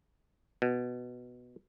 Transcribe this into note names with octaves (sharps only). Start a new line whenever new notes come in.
B2